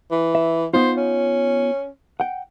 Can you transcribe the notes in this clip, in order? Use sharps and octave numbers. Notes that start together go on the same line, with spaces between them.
E3
E5
B3 D#4 F4 C5
C#4
F#5 G5